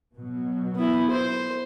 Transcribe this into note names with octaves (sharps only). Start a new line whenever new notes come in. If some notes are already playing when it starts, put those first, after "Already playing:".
B2 F#3
B3 E4
C5